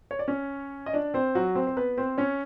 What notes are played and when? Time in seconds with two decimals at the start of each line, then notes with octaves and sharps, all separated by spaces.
0.11 C#5
0.19 D5
0.28 C#4 C#5
0.86 D#5
0.93 D4 D5
1.14 C4 C5
1.35 F#3 F#4
1.55 C4 C5
1.67 C5
1.77 B3 B4
1.97 C4 C5
2.18 C#4 C#5